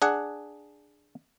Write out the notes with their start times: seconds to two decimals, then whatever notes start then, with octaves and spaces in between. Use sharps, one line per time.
0.02 D4 G#4 F#5